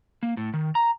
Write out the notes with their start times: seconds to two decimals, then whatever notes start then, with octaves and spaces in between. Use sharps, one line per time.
0.23 A#3
0.37 A2
0.54 D#3
0.75 A#5